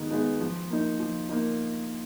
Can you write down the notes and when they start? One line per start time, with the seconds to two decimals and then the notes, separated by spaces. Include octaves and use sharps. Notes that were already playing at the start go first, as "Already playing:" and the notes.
Already playing: D#3 G#3 B3 D#4
0.11 G#3 B3 D#4
0.40 F3
0.70 A#3 D#4
1.00 F3
1.29 A#3 D#4